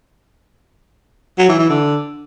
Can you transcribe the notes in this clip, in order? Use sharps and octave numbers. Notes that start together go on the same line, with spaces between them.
F#3
E3
E3
D3